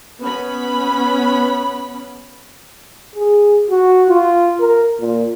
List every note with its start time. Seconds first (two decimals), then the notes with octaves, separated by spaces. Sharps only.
0.21 B3 C#4 B5
3.15 G#4
3.70 F#4
4.09 F4
4.60 A#4
5.00 A#2